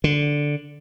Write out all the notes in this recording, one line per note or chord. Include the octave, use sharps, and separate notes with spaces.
D3